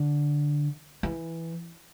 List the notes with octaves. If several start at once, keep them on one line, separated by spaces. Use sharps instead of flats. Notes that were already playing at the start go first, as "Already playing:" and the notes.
Already playing: D3
E3